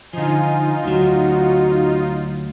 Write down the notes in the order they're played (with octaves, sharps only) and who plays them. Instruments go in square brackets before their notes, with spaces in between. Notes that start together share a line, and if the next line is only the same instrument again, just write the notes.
[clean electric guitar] D3 F3 [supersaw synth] D#4 F4 [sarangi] G#5
[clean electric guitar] D2 F#3 [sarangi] F#4